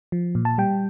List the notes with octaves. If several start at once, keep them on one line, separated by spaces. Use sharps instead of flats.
F3
A#2
A5
G3 G5